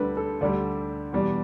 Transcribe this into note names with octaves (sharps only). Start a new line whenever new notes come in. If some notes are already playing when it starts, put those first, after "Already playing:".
Already playing: D2 D3 G3 B4
A4
D2 D3 G3 D5
E2 B2 G3